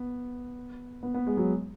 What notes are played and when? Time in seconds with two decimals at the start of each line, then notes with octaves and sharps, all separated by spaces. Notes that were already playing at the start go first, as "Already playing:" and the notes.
Already playing: B3
1.03 B3
1.14 B3
1.27 G#3
1.37 F#3